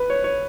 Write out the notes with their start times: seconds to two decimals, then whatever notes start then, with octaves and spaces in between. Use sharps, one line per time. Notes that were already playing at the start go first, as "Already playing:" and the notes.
Already playing: B4
0.10 C#5
0.24 C#5